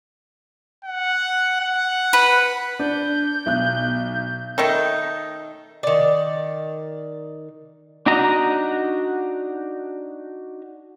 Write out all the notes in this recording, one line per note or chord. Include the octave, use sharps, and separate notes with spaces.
F#5
F#5
B4
D4 G6
B1 F#6
D#3 A3 D#4
D#3 D5
D4 D#4 F#4 D#5 A#5